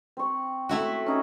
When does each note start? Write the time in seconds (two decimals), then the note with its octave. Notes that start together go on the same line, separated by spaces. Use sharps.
0.17 C4 C#6
0.69 A3 E4 F#4
1.06 C#4 D#4 G#4